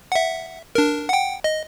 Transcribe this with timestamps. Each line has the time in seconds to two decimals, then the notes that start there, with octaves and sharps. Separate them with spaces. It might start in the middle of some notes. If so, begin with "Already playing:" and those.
0.12 E5 F#5
0.75 D4 A#4
1.09 F#5 G5
1.44 D#5